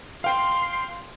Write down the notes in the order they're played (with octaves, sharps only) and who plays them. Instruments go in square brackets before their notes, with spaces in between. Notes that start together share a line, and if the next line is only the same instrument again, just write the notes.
[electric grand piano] F5 G5 [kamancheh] C6